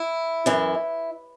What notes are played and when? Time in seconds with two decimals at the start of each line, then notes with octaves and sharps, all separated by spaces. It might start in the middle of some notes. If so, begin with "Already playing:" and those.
Already playing: E4
0.46 F#2 E3